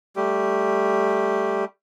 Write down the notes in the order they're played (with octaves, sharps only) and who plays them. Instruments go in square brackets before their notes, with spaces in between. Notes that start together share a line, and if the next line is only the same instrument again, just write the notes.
[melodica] G3 A3 G4